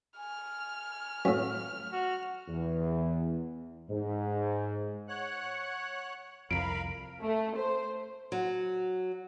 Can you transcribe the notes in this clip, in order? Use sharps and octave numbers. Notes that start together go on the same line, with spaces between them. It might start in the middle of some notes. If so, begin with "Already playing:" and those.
G#5 F6
F#2 A2
F#4
E2
G#2
C#5 F#5 F#6
C2 F2 A#4 F5 B5 D7
A3
C5
F#3